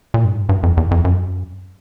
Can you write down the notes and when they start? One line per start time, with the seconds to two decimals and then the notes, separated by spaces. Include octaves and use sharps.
0.14 A#2
0.25 G2
0.35 G#2
0.49 G2
0.63 F2
0.77 E2
0.91 F2
1.05 F#2